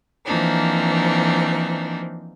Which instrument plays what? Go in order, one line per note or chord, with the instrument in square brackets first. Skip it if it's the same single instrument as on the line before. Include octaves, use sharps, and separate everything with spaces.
[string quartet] E3 F3 A#3 C4 D4 D#4